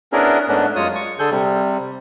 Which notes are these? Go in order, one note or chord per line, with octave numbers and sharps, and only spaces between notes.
B3 C#4 D4 E4 G#4 A#4
G#2 A3 B3 C#4 D4
F#2 G#3 F4 C#5 D#6
C#6
D3 G#4 A4 G6
C3 G3